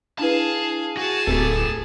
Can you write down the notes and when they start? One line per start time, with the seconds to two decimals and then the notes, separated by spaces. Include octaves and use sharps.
0.19 D4 E4 G#4 B4 F5 A5
0.97 F#4 G#4 A5
1.27 D1 G4 A4